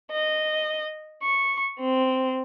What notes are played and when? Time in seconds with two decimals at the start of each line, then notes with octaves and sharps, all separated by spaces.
0.11 D#5
1.22 C#6
1.78 C4